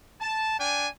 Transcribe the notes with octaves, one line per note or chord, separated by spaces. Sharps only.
A5
D4 G5 G#5